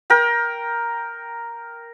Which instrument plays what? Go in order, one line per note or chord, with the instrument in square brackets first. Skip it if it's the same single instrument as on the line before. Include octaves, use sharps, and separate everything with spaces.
[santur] A#4 G5